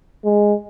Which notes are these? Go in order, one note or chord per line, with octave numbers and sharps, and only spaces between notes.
G#3